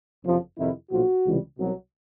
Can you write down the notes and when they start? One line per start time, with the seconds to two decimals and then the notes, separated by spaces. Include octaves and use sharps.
0.23 F#1 F2 C3 F3
0.57 F2 C3 D#3 E4
0.90 B1 A#2 F3 F#4
1.25 C#2 C3 E3 G3
1.57 C2 B2 F#3